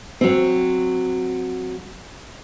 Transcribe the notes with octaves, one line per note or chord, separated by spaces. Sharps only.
F#3 C4